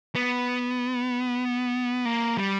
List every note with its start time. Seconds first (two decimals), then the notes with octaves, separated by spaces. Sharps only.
0.15 B3
2.05 A#3
2.38 G3